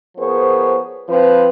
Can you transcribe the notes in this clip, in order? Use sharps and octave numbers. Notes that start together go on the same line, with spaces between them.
F3 B3 G#4 A#4 C5 C#5
F3 C4 B4